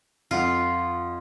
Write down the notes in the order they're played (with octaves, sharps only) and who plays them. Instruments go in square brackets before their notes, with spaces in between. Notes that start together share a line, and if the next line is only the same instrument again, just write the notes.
[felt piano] F2 F#5 [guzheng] F4